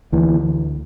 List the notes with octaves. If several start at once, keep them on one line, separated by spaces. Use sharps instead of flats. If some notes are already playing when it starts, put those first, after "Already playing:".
D2 E3